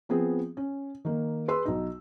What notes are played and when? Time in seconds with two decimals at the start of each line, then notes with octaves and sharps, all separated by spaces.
0.09 F3 B3 C4 G#4
0.57 C#4
1.05 D#3 A#3
1.48 G#4 B4 C6 E6
1.65 B1 D#4